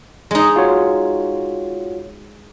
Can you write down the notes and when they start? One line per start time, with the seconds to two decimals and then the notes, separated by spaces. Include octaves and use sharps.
0.31 G#3 D#4
0.56 F4 F#4 C#5